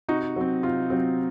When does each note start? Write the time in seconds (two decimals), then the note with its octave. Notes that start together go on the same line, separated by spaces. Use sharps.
0.08 C3 D#4 F#4
0.36 F#3 C4
0.63 C3 F4
0.90 F#3 C4